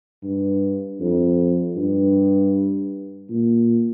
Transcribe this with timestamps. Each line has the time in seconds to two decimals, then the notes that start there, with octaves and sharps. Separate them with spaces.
0.23 G2
1.00 F2
1.76 G2
3.29 A#2